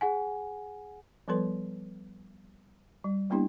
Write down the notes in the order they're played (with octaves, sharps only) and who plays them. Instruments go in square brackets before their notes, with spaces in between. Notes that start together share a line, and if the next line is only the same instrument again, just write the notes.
[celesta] G#4 F#5 G#5
[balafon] F3 G3 B3 A4 B4 C6
G3
G3 A#3 B3 D4 E4 G4